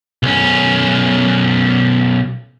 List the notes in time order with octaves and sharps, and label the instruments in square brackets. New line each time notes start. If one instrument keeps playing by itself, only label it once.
[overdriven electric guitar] B1 C#4